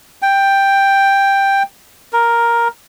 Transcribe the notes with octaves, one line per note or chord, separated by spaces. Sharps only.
G5
A#4